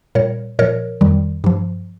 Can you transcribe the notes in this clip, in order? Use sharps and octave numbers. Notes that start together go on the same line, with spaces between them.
A#2 G3 A#4 C#5
A#2 F3 A#4 C#5
F2 D#3 G3
G2 F3